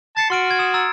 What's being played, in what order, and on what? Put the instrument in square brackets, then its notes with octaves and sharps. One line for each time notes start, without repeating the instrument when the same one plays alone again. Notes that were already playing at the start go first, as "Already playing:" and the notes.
[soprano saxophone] A5 [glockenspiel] A6 C7 C#7
[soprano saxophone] F#4 [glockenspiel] C6 F6 D7
[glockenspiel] F6 G#6
D#6 E7
A#5 E6 A6